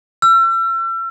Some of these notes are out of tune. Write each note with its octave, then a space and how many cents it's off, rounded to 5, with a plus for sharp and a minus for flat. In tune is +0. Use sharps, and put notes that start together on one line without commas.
E6 +40